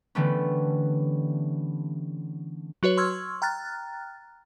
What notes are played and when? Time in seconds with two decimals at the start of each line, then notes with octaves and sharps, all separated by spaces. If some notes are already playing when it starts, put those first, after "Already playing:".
0.15 D3 E3 G3 A3 B3 C#4
2.83 F#3 F#4 B4 C#5
2.97 C6 C#6 E6 F6 G#6
3.42 G5 A#5 F6 F#6 A6